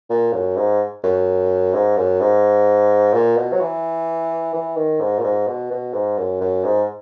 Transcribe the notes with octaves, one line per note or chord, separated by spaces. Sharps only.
A#2
F#2
G#2
F#2
G#2
F#2
G#2
A#2
B2
F#3
E3
E3
D#3
G#2
A#2
G#2
B2
B2
G#2
F#2
F#2
G#2